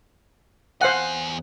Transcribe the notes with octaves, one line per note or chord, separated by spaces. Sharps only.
E2 C5 F5 F#5 G#5